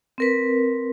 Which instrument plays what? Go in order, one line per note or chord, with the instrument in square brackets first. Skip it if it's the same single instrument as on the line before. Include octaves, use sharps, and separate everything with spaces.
[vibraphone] C4 A#4 B4